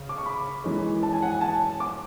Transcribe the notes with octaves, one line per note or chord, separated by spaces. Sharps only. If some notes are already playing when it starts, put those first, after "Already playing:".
Already playing: C#3
D6
C#6
B5
F#2 E3 G#3
A5
G#5
F#5
G#5
A5
D6